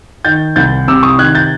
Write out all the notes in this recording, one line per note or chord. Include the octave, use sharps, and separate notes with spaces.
D#3 G6 A6
C2 G6 A6
C3 D6 E6
C#6 D#6
D#3 F#6 G#6
G6 A6